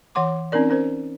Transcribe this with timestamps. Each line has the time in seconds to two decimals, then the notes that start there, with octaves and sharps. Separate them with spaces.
0.15 E3 C#5 F#5 C6 D6
0.52 C4 C#4 D#4 A#4 D5
0.70 C#4 A#4 C5